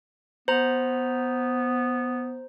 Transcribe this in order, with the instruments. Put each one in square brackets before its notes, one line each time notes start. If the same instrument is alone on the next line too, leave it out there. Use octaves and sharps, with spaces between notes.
[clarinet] B3 [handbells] C5 A#5